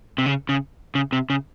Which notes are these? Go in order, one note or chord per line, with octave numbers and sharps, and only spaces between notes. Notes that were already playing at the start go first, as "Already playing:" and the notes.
C3
C#3
C#3
C#3
C3
C#3